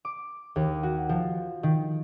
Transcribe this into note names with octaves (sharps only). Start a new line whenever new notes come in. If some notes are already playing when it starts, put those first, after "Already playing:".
D6
D#2
F#4
F3
D#3